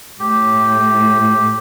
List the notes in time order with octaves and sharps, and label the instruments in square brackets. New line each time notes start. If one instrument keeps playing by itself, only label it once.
[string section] A2 [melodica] G4